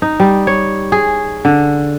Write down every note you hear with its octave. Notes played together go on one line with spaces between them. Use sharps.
D#4
G3
C#5
G#4
D3